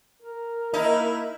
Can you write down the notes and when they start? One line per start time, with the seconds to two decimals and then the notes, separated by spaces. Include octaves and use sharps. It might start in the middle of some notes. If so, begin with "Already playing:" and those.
0.22 A#4
0.74 A#3 D#4 E4